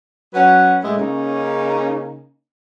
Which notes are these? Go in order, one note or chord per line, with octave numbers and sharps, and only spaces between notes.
F#3 C#4 B4 F#5
A2 G#3 E4
C#3 A#3 C#4 D#4